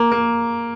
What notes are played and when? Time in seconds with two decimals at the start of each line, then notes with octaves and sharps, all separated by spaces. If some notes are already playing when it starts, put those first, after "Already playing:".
Already playing: A#3
0.11 A#3